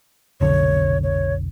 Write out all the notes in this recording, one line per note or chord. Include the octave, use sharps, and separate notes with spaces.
F1 B1 D3 C#5
C#5